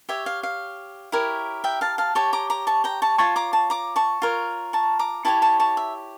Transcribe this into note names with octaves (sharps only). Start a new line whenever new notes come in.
G4 C#5 E5
F5
F5
E4 G4 A#4 C#5
E5 G5
F5 A5
F5 A5
G4 C#5 A5 C#6
A#5 D6
A#5 D6
A5 C#6
G5 A#5
A5 C#6
F4 C#5 A5 C#6
A#5 D6
A5 C#6
A#5 D6
A5 C#6
F4 A#4 C#5
A5 C#6
A#5 D6
E4 G4 C#5 A5 C#6
A5 C#6
A5 C#6
E5